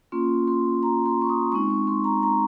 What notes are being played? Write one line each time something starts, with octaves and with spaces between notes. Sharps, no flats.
A#3 C#4 F4 C6
C6
A#5
C6
C#6
D#6
G#3 C4 D#4 C#6
C#6
C6
A#5
A#5